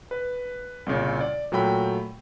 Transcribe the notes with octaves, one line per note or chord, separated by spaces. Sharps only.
B4
C2 A#2 C#3
D5
A#2 F#3 A3 G5 B5